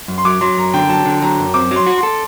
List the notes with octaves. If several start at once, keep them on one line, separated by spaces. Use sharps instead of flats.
F#2
C6
F#3 D6
F#3 C6
F#2 A#5
D3 G5
F#3 A5
D3
F#3 A#5
F#2
C4 D6
F#3 C6
F#4
C6
A4